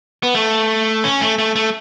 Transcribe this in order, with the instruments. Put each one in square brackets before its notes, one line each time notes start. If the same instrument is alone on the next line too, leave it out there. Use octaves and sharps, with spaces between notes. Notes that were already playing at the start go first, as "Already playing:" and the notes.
[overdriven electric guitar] B3
A3
C#4
A3
A3
A3